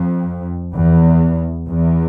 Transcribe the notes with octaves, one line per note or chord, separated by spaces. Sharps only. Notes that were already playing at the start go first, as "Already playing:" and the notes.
Already playing: F2
E2
E2